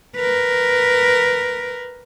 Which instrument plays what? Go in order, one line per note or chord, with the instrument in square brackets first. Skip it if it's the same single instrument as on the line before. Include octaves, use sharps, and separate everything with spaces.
[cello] A#4 B4